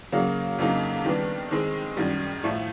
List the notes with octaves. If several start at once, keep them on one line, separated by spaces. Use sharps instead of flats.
C#3 F#3 A#3
F2 C#3 F#3 A#3 D#4
D#3 G3 B3 D4
D#3 G#3 C4
F#2 D#3 G3
A2 F3 A3